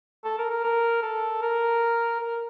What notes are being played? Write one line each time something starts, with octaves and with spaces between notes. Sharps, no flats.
A4
A#4
A#4
A#4
A4
A#4
A#4